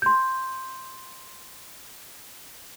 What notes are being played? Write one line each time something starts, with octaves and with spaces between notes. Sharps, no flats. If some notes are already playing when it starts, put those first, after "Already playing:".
C6 G6